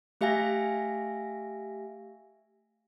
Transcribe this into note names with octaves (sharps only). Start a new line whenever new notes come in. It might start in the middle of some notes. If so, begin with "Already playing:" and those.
A3 G4 E5 F5 G#5 A#6